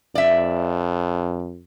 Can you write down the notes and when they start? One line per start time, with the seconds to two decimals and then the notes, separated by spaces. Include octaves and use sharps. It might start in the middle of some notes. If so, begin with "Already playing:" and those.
0.15 F2 D5 E5